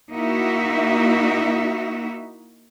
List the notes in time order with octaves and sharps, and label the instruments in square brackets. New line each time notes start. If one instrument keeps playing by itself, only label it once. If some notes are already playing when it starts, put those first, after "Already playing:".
[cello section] A#3 D#4 E4 F#4 E5